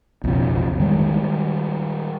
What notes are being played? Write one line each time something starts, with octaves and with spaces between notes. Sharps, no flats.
B1 F2 C#3
D#3 F3 G3 G#3